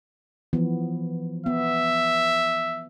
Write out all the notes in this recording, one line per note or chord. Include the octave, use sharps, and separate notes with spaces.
E3 F3 B3
B3 E5